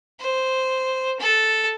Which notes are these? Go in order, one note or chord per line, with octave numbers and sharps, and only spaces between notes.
C5
A4